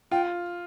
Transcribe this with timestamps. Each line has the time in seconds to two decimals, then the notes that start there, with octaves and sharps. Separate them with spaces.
0.11 F4 G5